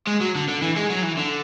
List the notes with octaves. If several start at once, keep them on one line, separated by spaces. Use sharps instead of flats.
G#3
F#3
D3
D3
E3
G#3
F#3
E3
D3